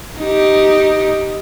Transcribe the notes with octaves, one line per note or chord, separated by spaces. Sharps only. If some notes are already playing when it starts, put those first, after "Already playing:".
D#4 G4